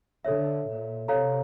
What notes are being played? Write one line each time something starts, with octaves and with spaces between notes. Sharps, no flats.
D3 A4 C#5 E5
A#2
C3 A4 C#5 F5 A#5